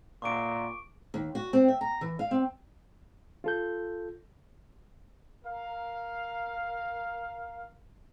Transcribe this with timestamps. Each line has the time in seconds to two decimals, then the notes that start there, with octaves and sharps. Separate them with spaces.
0.22 A#2 C#6 D6 D7
1.14 D#2
1.35 F#4
1.53 C4
1.68 E5
1.81 A#5
2.01 E3
2.19 F5
2.31 C4
3.44 F4 A4 G6
5.45 A#4 F5